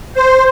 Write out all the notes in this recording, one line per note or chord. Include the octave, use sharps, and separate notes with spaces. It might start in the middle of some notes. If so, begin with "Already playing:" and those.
C5